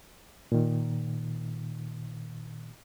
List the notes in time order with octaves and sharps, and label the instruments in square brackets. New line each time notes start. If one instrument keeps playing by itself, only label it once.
[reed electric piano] A#2 D#3